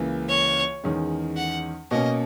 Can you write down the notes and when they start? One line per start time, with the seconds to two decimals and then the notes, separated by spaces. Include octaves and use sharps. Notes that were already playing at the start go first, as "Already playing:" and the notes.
Already playing: C#2 C#3 E3 A#3
0.29 C#5
0.84 E2 D#3 G#3 C#4
1.37 F#5
1.91 B2 A#3 C#4 D#5